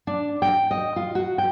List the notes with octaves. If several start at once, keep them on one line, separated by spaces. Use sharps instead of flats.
D4
G5
D#5
F4
F#4
G5